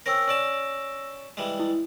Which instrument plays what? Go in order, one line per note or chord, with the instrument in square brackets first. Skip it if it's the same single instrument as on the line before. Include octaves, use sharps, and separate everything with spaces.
[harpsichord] C4 C#4 A#4 [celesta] E6 A#6
[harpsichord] C#4 D5 A5
E3 G3 G#3
[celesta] E4